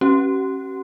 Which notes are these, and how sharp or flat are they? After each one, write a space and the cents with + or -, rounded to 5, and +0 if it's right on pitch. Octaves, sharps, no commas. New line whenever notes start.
C#4 -25 G4 -45